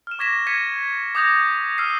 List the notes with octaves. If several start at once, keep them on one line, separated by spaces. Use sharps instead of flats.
F6 E7
C#6 D6 G#6 A#6 B6 E7
G#6 A#6 B6 C#7 D#7
D6 D#6 G6 A#6 F7
E6 F6 A#6 C7 D#7